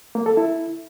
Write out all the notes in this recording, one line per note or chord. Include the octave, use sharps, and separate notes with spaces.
A#3
A4
E4